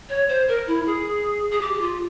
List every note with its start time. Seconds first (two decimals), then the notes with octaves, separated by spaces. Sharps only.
0.09 C#5
0.29 C5
0.48 A#4
0.67 E4
0.86 G#4
1.52 G#4
1.61 G4
1.73 G4
1.81 F4